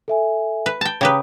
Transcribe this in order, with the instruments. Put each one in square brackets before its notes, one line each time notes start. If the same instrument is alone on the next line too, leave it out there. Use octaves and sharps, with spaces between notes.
[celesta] A4 E5 G#5
[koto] B4
G5 A5
[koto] C#3 G4 B4 [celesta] G5 A#5 D#6